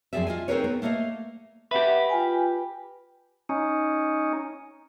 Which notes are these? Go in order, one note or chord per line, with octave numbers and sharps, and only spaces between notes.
F#2 F3 C4 G#4 D5 E5
F4 D#5 G#5
C4 D#4 G#4 A#4 B4 C#5
B3
A3 A#3 A4 D#5 F5
G4 B4 E5 F#5
F4 G5 G#5
C#4 D#4